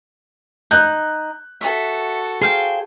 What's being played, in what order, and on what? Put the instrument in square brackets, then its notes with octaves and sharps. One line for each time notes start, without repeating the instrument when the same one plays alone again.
[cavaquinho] D#4 [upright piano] F#6 G6
[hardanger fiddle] F#4 A4 [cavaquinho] E5
[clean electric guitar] G#4 [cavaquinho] C5 F5 G5